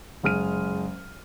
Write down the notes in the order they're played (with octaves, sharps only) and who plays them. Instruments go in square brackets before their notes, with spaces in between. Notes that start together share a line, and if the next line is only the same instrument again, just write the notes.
[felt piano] F#1 G#3 F6 D#7